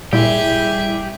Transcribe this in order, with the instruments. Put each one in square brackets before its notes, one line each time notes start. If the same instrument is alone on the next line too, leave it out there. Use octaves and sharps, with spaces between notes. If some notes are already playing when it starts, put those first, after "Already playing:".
[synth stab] A#2 [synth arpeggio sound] G3 E4 [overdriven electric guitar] G4 [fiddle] G#4 E5